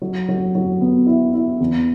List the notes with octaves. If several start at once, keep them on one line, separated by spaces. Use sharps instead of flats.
F#3
F#3
F#3
B3
E4
E4
E2